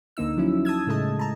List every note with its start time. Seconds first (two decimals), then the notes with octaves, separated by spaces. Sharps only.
0.17 D2 D3 A#3 D#4 E6
0.37 F3 F#3 C#4 E4
0.65 A5 D#6 E6 G#6
0.87 A2 C#3 G#3 A3 D#5 A5
1.19 A5 A#5